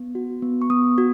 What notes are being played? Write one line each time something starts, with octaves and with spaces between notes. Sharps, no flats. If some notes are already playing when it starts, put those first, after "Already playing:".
Already playing: B3
F#4
B3
C#6
B3 D#6
F#4